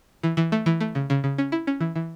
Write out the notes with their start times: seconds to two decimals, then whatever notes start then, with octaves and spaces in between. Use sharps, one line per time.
0.23 E3
0.37 E3
0.52 A3
0.66 E3
0.80 A3
0.95 C#3
1.10 C#3
1.24 C#3
1.38 C#4
1.52 E4
1.67 C#4
1.81 E3
1.95 E3